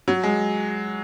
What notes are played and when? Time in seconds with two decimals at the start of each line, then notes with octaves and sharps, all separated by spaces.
0.08 F#3
0.24 G#3